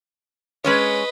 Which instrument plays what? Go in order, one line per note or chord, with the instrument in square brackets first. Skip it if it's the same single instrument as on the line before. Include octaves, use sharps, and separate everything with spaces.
[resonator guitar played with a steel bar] G#3 C#4 C#5 [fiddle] B4 D#5